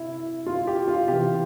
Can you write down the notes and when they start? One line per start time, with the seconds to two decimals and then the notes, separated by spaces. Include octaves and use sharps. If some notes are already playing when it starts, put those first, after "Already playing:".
Already playing: C3 E4
0.46 F4
0.67 G4
0.88 F4
1.08 C3 E3 G4